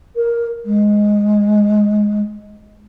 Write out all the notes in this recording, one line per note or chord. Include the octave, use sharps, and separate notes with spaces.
A#4
G#3